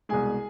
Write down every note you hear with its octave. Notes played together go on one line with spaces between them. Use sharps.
C2 B2 G#3 G#4 G#5